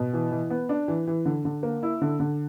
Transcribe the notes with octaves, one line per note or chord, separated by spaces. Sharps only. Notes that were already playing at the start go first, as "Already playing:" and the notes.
Already playing: B2
E3
E3
B3
D4
E3
E3
D3
D3
A#3
E4
D3
D3